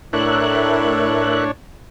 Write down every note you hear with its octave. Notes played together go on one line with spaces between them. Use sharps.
A2 D4 A#4 C#5 E5 F#6